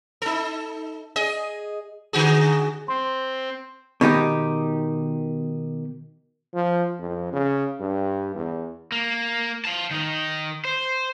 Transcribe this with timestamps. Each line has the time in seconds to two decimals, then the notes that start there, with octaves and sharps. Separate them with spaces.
0.22 D#4 A4
1.16 G#4 D#5
2.13 D3 F#4 G#4
2.88 C4 C6
4.01 B2 D#3 D#4 G4
6.54 F3
6.99 F2
7.33 C#3
7.80 G2
8.36 E2
8.92 A#3
9.65 F5 A5
9.91 D#3 D#4
10.65 C5